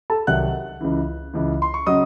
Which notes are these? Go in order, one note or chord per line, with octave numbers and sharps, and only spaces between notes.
A4 A5
C2 C3 D#3 F#3 F#5 F#6
C#2 C#3 E3
C#2 C#3 E3
C6
C#6
C#3 F#3 D#5 D#6